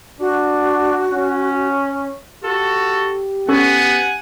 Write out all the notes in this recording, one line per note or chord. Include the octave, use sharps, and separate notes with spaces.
D4 F#4
C#4
F#4 G4 A4
B3 C#4 A4 F#5 G#5 C#6